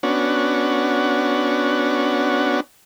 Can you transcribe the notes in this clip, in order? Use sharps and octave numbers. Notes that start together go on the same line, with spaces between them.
B3 C#4 D4 F#4